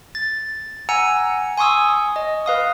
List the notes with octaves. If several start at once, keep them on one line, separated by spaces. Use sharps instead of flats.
A6
F#5 G#5 A#5 E6 C#7
G#5 C6 C#6 D#6 E6
D#5
B4 F5 D#6